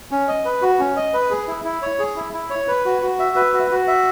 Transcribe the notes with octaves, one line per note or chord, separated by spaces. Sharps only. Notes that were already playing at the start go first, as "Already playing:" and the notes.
C#4
D#5
B4
F#4
C#4
D#5
B4
G#4
E4
E4
C#5
G#4
E4
E4
C#5
B4
F#4
F#4
E5
B4
F#4
F#4
E5